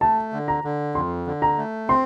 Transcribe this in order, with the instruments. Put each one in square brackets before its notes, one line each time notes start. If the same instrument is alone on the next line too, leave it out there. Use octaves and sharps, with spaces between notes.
[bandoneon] A3 [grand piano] A5
[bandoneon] D3
[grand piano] A#5
[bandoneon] D3
[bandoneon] F2 [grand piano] C6
[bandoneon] D3
[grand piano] A#5
[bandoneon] A3
[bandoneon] C4 [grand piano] C6